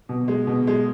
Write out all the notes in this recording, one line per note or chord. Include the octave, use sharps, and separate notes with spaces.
B2
G#3
B2
G#3